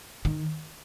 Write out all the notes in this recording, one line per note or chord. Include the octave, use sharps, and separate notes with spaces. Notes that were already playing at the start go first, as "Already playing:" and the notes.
D#3